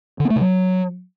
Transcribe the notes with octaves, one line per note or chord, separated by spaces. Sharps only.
D3
B3
A3
C3
F#3